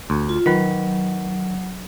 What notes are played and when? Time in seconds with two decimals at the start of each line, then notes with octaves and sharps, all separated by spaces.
0.10 D2
0.29 F4
0.46 D#3 F#3 B4